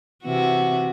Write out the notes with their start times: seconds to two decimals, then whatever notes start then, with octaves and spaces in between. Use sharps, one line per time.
0.24 C3 E3 F#4